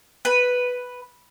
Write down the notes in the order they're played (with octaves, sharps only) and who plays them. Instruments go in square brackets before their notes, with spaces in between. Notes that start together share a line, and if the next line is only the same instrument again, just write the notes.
[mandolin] B4